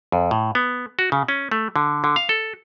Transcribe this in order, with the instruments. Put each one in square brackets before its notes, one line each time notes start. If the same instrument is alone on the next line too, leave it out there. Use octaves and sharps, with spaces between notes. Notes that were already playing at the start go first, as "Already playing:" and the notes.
[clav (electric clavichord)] F2
A2
B3
F#4
C#3
C#4
A3
D3
D3
F5
A4